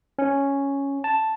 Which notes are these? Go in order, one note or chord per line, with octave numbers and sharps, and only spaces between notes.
C#4
A5